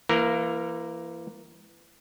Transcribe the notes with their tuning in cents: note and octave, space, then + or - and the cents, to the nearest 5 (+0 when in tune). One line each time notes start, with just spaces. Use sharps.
E3 +25 A#3 +0 A#4 +0